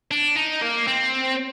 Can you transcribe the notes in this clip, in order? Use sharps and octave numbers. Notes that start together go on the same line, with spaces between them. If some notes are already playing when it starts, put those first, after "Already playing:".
D4
D#4
A#3
C4